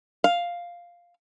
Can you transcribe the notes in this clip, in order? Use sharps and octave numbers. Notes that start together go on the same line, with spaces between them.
F5